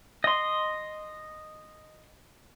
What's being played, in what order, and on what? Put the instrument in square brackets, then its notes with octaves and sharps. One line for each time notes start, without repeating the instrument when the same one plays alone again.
[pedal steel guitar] D#5 C6